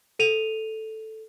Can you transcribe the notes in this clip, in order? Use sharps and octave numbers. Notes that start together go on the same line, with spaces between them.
A4 D#7 F7